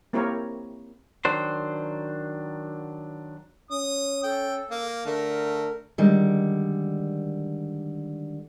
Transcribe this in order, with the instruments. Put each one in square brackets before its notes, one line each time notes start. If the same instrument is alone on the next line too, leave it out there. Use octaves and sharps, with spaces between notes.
[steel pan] A#3 C4 E4 G4 A#4 C#5
[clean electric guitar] D#3 F#3 D4 C5
[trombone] C#4 [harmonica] D#6
[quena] A4 [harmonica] G5
[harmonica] A#3 F5
[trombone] D3 [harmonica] A3 [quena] A#4
[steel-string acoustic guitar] D3 D#3 G3 G#3